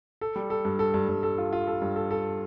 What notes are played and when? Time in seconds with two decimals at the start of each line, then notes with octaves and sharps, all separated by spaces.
0.21 A4
0.36 G3
0.50 A4
0.65 G2
0.79 A4
0.94 G2
1.08 G2
1.23 A4
1.38 F4
1.53 F4
1.67 A4
1.82 G2
1.96 A4
2.11 A4